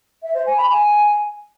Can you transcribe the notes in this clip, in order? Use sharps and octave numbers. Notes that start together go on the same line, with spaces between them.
E5
C5
G#5
B5
G#5